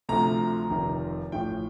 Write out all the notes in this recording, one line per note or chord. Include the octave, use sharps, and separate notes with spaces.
D2 C3 F3 A3 A#5
F1 F2 C3 D#3
A1 A2 F3 G5